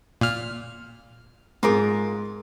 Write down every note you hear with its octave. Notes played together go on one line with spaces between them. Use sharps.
A#2 F6
G#2 G#3 F4 A#4 D6